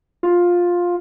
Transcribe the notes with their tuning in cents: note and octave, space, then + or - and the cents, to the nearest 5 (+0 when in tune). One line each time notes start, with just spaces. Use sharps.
F4 +10